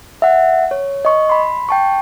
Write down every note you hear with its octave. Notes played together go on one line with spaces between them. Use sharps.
E5 F#5
C#5
D#5 C#6
B5 C6
G5 A5 C#6